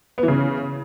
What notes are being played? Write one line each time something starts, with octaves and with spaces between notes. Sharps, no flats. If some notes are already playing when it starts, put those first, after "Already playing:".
B3
E3
C#3